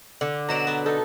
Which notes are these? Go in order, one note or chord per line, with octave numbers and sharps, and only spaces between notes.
D3
B2 F#3 D5 A#5 E7
B3
D#4 A4